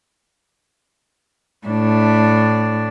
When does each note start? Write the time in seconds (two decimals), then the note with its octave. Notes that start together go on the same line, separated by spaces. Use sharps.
1.67 A2 D4